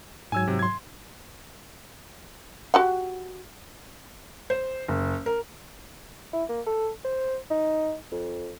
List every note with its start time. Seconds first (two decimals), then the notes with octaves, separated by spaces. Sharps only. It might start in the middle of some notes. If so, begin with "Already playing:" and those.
0.32 G#2 F#3 G#5 E6 G#6
0.48 C3
0.59 C6 G#6
2.74 F#4 G4 F#5
4.50 C5
4.88 F#1
5.26 A#4
6.33 E4
6.49 A#3
6.66 A4
7.05 C5
7.50 D#4
8.12 F2